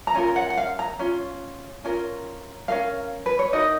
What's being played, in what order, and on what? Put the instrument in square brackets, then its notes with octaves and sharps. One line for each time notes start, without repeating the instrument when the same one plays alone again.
[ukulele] A#5
C#4 F4 A#4
F#5
F#5
F5
A#5
C#4 F4
C#4 F4 A#4
C#4 F4 A#4 F5
B4
C#5
D#4 F#4 A#4 D#5